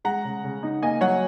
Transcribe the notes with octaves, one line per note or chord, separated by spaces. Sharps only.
G#3 F#5 A#5
C#3
C#3
D#4
A#3 D#5 G#5
F#3 C#5 F#5